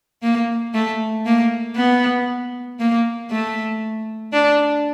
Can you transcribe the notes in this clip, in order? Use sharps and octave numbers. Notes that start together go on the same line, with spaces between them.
A#3
A3
A#3
B3
A#3
A3
D4